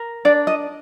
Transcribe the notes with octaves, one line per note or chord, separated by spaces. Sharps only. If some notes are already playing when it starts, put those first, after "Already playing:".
Already playing: A#4
D4 D5
D#5